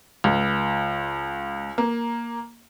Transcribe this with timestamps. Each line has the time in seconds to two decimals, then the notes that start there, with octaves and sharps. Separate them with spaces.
0.24 C#2
1.78 A#3